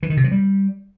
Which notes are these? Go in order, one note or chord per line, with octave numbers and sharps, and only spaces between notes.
E3
D#3
C3
F3
G3